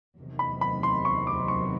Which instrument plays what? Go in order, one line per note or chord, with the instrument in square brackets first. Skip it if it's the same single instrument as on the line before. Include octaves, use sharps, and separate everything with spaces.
[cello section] E2 C3 D#3 F#3 A3
[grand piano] B5
B5
C6
C#6
D6
C#6